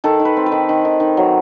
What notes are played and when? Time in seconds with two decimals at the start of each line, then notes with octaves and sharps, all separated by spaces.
0.04 D#3 A4
0.19 D#3
0.25 B4
0.37 C4
0.46 B4
0.52 D#3
0.69 D#3
0.85 D#3
1.00 D#3
1.17 F#3